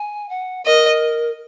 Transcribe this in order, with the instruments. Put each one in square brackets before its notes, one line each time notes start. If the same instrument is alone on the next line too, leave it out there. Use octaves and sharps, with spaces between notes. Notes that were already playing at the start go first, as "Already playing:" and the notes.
Already playing: [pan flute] G#5
F#5
[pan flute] A#4 [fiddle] D#5